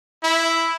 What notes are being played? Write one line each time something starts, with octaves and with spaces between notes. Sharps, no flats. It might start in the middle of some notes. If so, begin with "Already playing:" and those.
E4